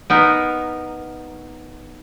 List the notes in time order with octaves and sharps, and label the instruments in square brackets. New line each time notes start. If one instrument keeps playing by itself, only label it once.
[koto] B3 D#4 A#4